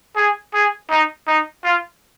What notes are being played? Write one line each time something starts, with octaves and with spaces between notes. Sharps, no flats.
G#4
G#4
D#4
D#4
F4